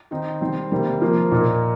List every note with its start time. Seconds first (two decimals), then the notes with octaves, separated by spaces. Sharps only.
0.11 D#3 C4 D#4
0.41 D#3 G3 C4
0.71 C3 D#3 G3 A#3
1.01 F3 A#3 F4
1.32 A#2 A#3 D#4